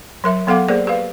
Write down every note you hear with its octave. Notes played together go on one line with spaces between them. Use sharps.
F#3 A#4 E5
F#3 B3 A4 F5 F#5 D6
A#3 G#4 A#4 C5 D5
G4 B4 F5